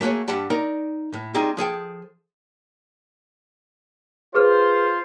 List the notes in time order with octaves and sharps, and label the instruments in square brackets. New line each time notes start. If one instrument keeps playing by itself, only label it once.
[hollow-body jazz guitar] A3 A#3 F#4 G#4 C#5
G2 G3 F#5 A5 B5
D#4 A#4 D5 A#5
A2
G3 C4 D#4 F4 G#4
F3 G#4 A4 G5
[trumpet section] F4 C5 [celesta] G#4 B4 F6